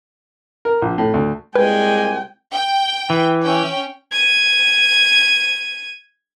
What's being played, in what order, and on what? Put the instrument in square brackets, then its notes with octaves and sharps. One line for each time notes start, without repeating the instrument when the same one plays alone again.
[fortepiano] A#4
A#1
A2
D2
[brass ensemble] C2 A#2 G#5 [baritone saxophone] G#3 [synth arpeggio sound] B4 [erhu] G5
[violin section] G5
[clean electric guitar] E3
[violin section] C#4 G5
[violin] G#6 D#7